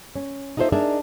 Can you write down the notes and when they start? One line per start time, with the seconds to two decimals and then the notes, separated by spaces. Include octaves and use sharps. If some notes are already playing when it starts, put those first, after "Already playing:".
0.16 C#4
0.57 D#4 F4 A4 A#4 C5 E5
0.72 D4 D#4 G#4 A#4 D5 E5